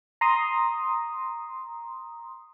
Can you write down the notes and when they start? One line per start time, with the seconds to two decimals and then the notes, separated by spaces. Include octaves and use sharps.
0.21 A#5 C6 D#6